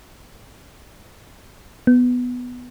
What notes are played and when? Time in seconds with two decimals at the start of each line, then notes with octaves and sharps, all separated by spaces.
1.87 B3